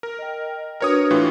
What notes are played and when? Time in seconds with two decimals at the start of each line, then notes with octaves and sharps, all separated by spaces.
0.03 A#4
0.19 D#5 G5
0.81 D4 F#4 A#4 B4 C#5 D#6
1.11 A2 E3 F4